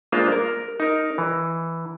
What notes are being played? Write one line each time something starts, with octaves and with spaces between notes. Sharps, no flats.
G#3 A#3 D4 F4 C5 F5
A#4
D#4 A#4
E3